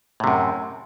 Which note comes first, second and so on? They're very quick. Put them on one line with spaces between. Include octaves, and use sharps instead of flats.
A2 C3 F#2